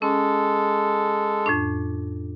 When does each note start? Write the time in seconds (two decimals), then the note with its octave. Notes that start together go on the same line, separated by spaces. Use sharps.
0.02 G#3 C#4 A4
1.46 F2 A2 D4